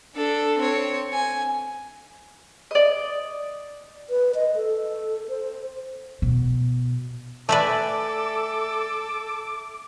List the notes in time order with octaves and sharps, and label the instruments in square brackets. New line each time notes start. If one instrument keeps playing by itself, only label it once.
[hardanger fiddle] D4 A4
C4 C#5
G#5
[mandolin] D5 D#5
[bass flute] B4
D#5
A4
C5
[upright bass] B2
[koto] A3 B4 [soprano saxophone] A4 [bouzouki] D5 E5 G#5 [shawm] D6